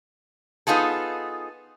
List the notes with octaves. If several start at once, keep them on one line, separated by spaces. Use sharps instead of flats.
B3 D#4 F4 G#4 A4